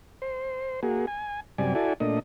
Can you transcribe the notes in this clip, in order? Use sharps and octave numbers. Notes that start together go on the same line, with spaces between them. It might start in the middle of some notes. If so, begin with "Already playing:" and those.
C5
A#3 F#4 G#4
G#5
F#2 C3 G3 D5 G#5
E4 F#4 A4 D5 G#5
A#2 A3 D4 D#5